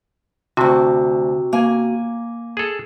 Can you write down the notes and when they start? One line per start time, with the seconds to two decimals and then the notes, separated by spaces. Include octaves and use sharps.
0.57 D2 C3 F#4 A5
1.53 A#3 G#5
2.57 G#4 A4